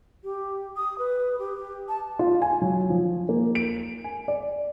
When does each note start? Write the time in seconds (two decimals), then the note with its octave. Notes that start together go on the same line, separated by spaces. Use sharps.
0.24 G4
0.76 D#6
0.99 B4
1.39 G4
1.89 A5
2.19 F4
2.42 G#5
2.62 F#3
2.90 F3
3.29 A#3
3.55 D7
4.04 G#5
4.28 D5